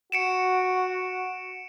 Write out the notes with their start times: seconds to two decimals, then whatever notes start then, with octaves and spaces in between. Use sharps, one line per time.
0.12 F#4 C#7 D7 E7